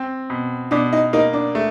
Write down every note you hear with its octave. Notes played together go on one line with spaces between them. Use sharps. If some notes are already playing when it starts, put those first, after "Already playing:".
Already playing: C4
B2
B2 D4 D5
D#4 D#5
A#3 D#4 D#5
D4 D5
A3